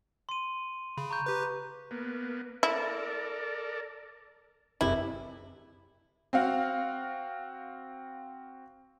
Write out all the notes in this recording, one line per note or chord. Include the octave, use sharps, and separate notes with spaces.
C6 D#7
C#3 B5
A#5 C#6 G6
G4 B4
A#3 B3
E4 A4 A#4 D5
F#1 C3 E4
C4 F#4 F5